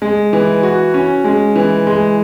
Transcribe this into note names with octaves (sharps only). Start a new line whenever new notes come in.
G#3
E3
F#4
C#4
G#3
E3
G#3